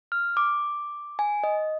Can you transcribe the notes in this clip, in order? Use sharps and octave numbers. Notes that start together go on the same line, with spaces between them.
F6
D6
G#5
D#5